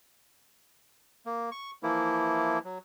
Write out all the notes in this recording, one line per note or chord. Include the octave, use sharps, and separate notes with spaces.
A#3
C#6
E3 F3 A#3 E4
F#3